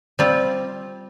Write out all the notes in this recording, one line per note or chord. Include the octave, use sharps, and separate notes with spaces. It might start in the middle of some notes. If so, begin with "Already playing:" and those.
G3 C4 F4